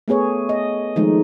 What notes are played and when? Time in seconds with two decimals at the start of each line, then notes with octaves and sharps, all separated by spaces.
0.08 A3 B3 G#4 C#5
0.49 D#5
0.96 D#3 F3 G#3 A3 D#4